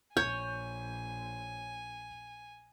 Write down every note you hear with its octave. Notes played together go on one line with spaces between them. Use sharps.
A#1 C#5 G#5 G6